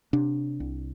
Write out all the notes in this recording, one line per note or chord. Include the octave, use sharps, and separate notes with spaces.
C3 D4
C2